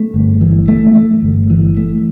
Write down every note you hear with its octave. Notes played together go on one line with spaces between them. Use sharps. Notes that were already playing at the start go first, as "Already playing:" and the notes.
Already playing: A3
G1
E3
A3
A3
G1
E3
A3